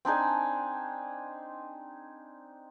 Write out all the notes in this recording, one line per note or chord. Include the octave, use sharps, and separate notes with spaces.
C4 D4 D#4 G#4